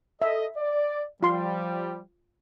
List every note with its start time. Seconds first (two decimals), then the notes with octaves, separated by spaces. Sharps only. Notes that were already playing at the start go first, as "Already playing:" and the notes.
0.22 A4 D#5 E5
0.57 D5
1.23 F3 G3 F4 C6